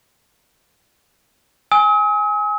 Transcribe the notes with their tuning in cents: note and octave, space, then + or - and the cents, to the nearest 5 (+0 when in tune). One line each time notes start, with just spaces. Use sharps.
G#5 +0 D#6 +45